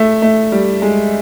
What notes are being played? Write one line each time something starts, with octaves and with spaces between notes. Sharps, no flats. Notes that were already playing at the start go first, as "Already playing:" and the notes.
Already playing: A3
A3
G3
G#3